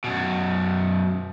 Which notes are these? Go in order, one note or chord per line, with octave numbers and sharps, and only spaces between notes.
F#2 B2